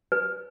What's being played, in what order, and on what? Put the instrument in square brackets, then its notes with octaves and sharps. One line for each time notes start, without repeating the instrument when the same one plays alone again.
[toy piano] B4